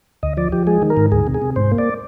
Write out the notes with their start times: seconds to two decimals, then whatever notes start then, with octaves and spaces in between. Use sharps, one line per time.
0.23 D2 D#5
0.37 F3 D5
0.52 F3 G4
0.67 G#3 G#4
0.82 D#3
0.90 A#4
0.97 G#2
1.12 D2 G#4
1.27 C3
1.34 G#4
1.42 C3
1.56 G#2 C5
1.72 A#3
1.78 D5